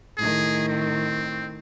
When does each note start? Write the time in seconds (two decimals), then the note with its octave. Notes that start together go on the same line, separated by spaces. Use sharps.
0.18 A2 D#3 G#4
0.68 C4